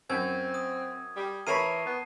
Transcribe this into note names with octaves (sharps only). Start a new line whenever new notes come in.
F#2 C4 G#6
D#6
G3
E3 A#4 C#5 A5 B5 C7 D#7
B3